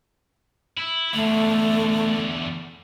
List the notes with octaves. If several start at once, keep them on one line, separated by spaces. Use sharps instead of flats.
E4
E2 D3 A3